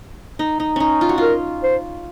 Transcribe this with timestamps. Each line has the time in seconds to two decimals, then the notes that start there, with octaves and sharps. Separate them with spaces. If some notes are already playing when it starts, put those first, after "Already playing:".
0.39 D#4
0.60 D#4
0.76 C#4 D#4
1.01 F4
1.09 F#4
1.18 F4 A#4
1.64 C5